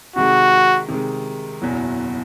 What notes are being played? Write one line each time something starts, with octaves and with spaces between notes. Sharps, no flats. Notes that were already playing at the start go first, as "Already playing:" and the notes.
C3 D#3 G#3 F#4
C3 D#3 G#3
F#1 E2 B2 F#3